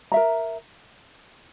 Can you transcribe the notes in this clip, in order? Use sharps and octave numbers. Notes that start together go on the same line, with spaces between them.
A#4 E5 A#5